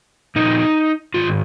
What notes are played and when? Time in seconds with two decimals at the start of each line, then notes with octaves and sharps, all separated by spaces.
0.36 A#2 F3 D#4
1.14 G#2 D#3 F4